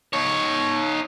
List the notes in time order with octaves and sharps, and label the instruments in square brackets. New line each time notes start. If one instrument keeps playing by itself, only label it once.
[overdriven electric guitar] D#4 C#5